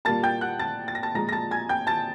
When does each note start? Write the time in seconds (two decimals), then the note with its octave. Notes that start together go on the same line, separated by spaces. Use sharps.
0.05 A#2 G3 A#3 A5 A6
0.23 G5 G6
0.41 F#5 F#6
0.59 A5 A6
0.88 A6
0.95 A#6
1.03 A5 A6
1.14 A#2 F3 G#3 A#5 A#6
1.29 A#6
1.32 A5 A6
1.51 G#5 G#6
1.69 G5 G6
1.87 A5 A6